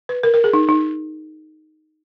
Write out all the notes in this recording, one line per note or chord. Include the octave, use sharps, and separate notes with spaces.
B4
A#4
A#4
G#4
D#4
D#4